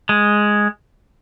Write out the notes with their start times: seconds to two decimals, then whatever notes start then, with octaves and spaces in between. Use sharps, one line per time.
0.09 G#3